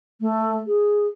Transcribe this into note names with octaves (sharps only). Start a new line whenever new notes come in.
A3
G#4